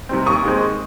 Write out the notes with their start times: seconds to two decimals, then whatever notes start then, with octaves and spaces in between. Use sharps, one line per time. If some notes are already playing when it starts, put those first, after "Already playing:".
0.09 C3 D#3 G3 C4
0.26 D#2 C#6 D#6
0.44 D#3 G#3 C4